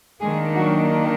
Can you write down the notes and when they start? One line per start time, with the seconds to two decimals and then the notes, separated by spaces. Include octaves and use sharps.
0.21 D#3 G#3 A#3 D4 G#4
0.55 F#3 F#4